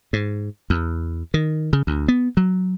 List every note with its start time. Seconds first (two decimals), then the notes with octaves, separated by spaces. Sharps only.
0.13 G#2
0.70 E2
1.34 D#3
1.73 C#3
1.87 D2
2.08 B3
2.37 F#3